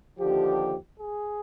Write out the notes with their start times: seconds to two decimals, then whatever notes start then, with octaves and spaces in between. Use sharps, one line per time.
0.18 D#2 D3 F3 G4
1.00 G#4